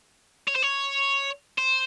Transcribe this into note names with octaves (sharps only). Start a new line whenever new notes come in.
C#5
C5
C#5
C5